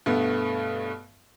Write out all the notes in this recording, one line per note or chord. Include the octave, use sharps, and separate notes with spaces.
G2 B2 A3 B3